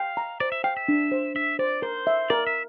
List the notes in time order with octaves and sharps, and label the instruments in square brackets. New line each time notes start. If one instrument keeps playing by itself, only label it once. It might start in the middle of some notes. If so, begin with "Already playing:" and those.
Already playing: [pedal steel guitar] F5 [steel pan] G5
[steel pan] A#5
[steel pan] C5 [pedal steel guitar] D5
[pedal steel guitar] E5
[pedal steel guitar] F5 [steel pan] G5
[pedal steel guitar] E5
[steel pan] D4
C5
[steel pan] D4 [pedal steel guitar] E5
[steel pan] C5 [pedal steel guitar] D5
[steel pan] A#4 [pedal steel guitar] C5
[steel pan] E5
[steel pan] A#4 [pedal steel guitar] D5
[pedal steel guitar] E5